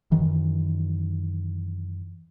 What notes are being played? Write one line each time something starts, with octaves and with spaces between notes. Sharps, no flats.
F#2 D#3 E3